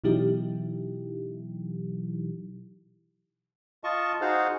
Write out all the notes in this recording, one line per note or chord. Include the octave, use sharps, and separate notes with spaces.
B2 E3 F#3 D#4 E4 G4
F4 D#5 A5 C#6
D#4 F#4 G#4 C5 F5 F#5